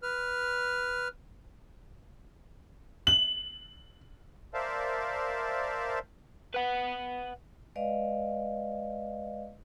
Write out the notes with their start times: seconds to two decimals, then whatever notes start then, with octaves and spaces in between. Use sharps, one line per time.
0.03 B4 F6
3.07 F#7
4.54 A#4 C5 D5 E5 F5 A5
6.55 B4 F#5
7.76 G#3 B4 D5 D#5 F5